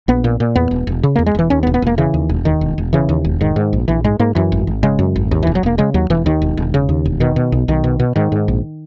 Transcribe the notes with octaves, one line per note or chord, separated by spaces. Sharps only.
A#1 B3
A#2
A#2
E2 B3
E1
E1
C#3
E2 A#3
G#3
E1 E3
D#2 C#4
B3
E1
B3
E1 A#3
C#3 E3
D#2
E1
D#2 D#3
E1
E1
C#3 E3
D#2
E1
G#2 D#3
G#2
A#1
A#1 E3
G#2 G#3
G#2 A#3
F#2 E3
G#1
G#1
C#3 G#3
F#2
G#1
D#2
E3
E1
F#3
E1 A#3
C#3 G#3
D#2 F#3
E1 E3
D#2 D#3
E1
E1
C#3
D#2
E1
B2 D#3
B2
B1
B1 D#3
B2
B2
G#2 D#3
G#2
A#1